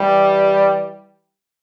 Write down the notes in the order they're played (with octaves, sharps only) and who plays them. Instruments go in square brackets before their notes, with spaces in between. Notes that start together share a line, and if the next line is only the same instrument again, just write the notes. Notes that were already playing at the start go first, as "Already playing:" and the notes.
Already playing: [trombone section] E3 G3